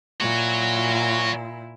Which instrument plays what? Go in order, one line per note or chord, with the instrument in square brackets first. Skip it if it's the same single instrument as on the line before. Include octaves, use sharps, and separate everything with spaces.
[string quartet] A#2 E4 [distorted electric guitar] F#4 C#5